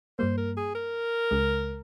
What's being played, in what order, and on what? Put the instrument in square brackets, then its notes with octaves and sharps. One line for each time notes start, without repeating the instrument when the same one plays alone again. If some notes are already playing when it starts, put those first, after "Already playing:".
[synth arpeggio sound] G2 G3 A#3 [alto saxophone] C5
[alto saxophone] A#4
G#4
A#4
[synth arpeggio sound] C#2 C#3 G#3